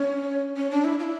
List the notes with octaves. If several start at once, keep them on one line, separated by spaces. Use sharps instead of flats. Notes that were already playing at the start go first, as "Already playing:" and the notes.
Already playing: C#4
C#4
D4
E4
F4
E4